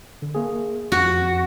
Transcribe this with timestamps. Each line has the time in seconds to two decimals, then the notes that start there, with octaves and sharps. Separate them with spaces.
0.22 D3
0.35 A#3 G#4
0.92 F2 F#4